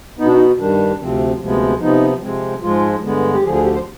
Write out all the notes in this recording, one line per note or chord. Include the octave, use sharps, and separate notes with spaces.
B2 B3 D4 D#4
D#4
G2 D#3 G3 D4
D2 C3 F3 C4
D2 C3 F3 G#3 B3
C3 F3 B3 D#4
C3 F3 G#3 C4
G#2 F3 G#3 F4
G2 D3 G#3 B3
G4
D2 D3 F3 G#4
G#4
G4
C5